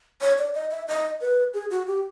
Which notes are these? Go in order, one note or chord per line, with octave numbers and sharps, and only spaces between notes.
C#5
D5
D#5
E5
D#5
B4
G#4
F#4
G4